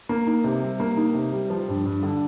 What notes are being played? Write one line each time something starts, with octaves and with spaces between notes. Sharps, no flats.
A#3
D#4
C3
G3
A#3
D#4
C3
G3
F3
G2
G2
D3